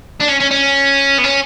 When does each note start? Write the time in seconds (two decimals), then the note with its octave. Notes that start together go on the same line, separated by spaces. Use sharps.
0.21 D4
0.29 C#4
0.41 C#4
0.51 C#4
1.18 B3
1.24 C#4